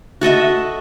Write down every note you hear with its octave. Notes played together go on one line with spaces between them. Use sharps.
F#4 A4 D#5 E5